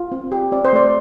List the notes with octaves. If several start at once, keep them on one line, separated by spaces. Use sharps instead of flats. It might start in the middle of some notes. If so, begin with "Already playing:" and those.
Already playing: F4
C4
G4
C4 D5
C5
A3 D5